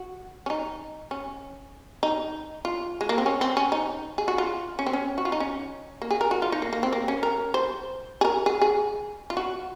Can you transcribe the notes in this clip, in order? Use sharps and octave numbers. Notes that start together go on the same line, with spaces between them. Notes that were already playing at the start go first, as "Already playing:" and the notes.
Already playing: F#4
C#4
D#4
C#4
D#4
F4
G#3
A#3
C4
C#4
C4
C#4
D#4
G#4
F#4
F4
C#4
C4
C#4
F#4
F4
D#4
C#4
A#3
G#4
A#4
F#4
F4
D#4
A#3
A#3
C4
A#3
C#4
A#4
C5
G#4
A#4
G#4
G#4
F4
F#4